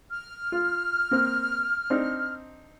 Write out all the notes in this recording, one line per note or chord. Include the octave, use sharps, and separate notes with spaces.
F6
F4
A#3 C4
C4 D4 D#4